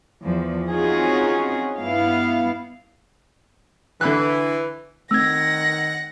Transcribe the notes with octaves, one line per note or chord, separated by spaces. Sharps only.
E2 F3
C4 C#4 D#4 F4 F#4 G#4
G2 B3 E4 F5
D3 E3 B5 F#6
D#3 A3 C4 F#5 E6 G#6 A#6